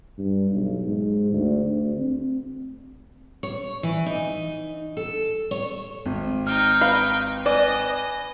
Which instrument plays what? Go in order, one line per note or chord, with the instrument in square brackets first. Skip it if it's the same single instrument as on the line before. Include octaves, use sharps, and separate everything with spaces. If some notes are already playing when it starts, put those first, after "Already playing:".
[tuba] G2
B1
G#2
D2
D2
C4
[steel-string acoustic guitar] C#5
E3
D#4
A4
C#5
[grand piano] G#1
[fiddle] D#4 G5 [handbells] F6
[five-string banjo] B4 F5
[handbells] B4 G#5 [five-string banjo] D5 [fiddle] D#5